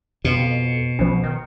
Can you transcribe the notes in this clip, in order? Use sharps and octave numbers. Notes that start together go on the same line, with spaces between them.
F2 B2
B1 F3 C#4
D#3